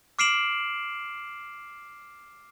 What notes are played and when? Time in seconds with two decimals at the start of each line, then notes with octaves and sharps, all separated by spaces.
0.19 D6 F6 C7 D7 E7 F#7